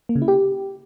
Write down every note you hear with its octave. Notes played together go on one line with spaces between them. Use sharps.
A#3
C#3
E4
G4